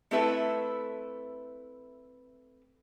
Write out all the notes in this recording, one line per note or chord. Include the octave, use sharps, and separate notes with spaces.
A3 C4 E4 A4 B4 E5